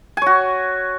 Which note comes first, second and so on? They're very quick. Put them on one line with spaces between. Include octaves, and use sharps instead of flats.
G#5 C#5 F#4